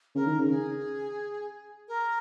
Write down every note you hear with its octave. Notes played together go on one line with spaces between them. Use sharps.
C#3 A#4
D#3
C#3
G#4
A#4